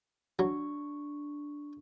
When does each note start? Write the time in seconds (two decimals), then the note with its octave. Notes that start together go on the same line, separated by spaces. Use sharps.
0.39 F#3 D4 C#6